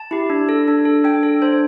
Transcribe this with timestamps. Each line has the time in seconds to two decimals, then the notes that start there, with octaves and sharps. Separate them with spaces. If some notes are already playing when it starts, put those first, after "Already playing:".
Already playing: A5
0.11 E4 G4
0.30 D4
0.49 A4
0.68 D4
0.85 A4
1.04 D4 G5
1.23 A4
1.42 D4 C5